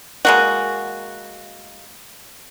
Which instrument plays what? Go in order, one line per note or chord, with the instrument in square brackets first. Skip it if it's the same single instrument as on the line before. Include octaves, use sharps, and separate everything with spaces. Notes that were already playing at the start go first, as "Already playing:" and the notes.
[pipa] G#3 A#3 F#4